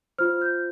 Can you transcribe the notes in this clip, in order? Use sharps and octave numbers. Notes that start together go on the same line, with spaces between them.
F4 C5 F6
G6